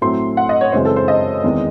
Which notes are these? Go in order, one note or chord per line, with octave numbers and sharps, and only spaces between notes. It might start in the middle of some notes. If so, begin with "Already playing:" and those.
A2 F#3 A3 C4 C6
F#5
D#5
C#5
F#2 C#3 E3 G#3 C4 C5
A4
C5
D#5
E2 D#3 G#3 C4